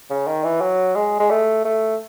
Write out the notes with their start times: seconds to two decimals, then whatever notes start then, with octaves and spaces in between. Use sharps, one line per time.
0.10 C#3
0.27 D#3
0.44 E3
0.61 F#3
0.95 G#3
1.19 G#3
1.30 A3
1.64 A3